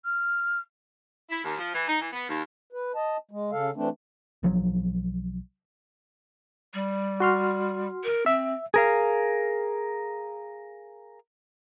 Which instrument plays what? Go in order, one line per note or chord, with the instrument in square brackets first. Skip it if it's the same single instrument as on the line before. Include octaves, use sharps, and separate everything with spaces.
[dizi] F6
[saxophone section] E4
D#2
F3
E3
D#4
E3
B3
D#2
[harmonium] B4
D#5 A5
G#3
C#3 A4 F5
E3 A3 C4 D4
[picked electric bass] B1 F3 F#3
[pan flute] G3
[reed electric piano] F#4 C6 F6
[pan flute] A#4
[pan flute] C4 [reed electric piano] E5
[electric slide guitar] G#4 A#4 F5